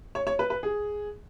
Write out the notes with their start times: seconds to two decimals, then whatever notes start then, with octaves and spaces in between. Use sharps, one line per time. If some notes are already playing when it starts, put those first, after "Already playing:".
0.15 C#5
0.27 C#5
0.39 B4
0.50 B4
0.63 G#4